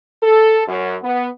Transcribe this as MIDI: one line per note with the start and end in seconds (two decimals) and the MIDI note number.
0.23 0.63 69
0.68 0.96 42
1.03 1.29 59